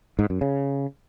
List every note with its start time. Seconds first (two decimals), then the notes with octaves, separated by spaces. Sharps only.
0.19 G#2
0.30 F#2
0.41 C#3